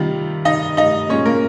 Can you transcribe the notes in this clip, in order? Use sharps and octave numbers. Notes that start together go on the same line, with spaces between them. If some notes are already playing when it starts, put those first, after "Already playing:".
Already playing: C3 D#3 G3 F4
D#4 D#5
D#4 D#5
A#2 G#3 C#4 C#5
A#3 A#4